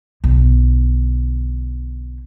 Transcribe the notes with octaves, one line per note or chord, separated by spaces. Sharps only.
B1 D3